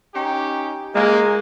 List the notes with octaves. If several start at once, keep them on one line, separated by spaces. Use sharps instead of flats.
C#4 D#4 G4
G#3 A#3